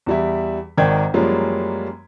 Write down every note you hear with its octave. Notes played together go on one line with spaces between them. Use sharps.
E2 G3 E4
G#1 D#3 A#4 D5 G5 G#6
F#2 F3 G3 G#3 A#3 C#4